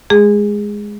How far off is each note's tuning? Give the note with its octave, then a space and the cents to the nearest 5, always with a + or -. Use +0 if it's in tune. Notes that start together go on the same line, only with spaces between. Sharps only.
G#3 +5 G#4 -15